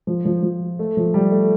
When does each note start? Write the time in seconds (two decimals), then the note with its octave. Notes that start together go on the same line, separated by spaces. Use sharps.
0.07 F3
0.25 F3
0.43 F3
0.79 A3
0.97 F3
1.14 G3
1.31 A3